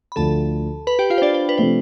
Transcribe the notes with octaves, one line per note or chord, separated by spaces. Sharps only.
B5
D2 D3 F3 A4 A5
B4 B5
G4 G5
F4 F5
C5
D4 D5
C5
B4
C3 F3 A3 C4 C5